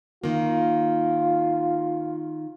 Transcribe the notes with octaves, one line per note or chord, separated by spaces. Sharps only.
D#3 A#3 F4